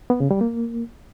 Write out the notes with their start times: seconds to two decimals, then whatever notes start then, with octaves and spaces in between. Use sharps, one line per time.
0.10 B3
0.20 C#3
0.31 G3
0.41 A#3